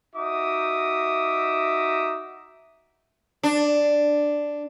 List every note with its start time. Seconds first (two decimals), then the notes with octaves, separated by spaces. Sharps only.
0.15 D#4 F#4 E5 D6 D#6
3.43 D4